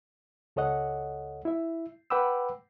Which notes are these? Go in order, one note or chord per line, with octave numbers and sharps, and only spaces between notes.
C#2 A4 C#5 D#5 F#5
E4 E5
B4 F#5 G5 B5 D6 E6